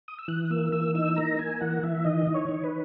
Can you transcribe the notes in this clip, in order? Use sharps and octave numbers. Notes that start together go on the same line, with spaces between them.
D#6
E6
E3 F#6
F#6
A#3 E6
E3 E6
D#4 E6
A#3 A#5
A#3 G#5
E3 F#5
E3 E5
D#3 D#5
D#3
C#5
D#3
B4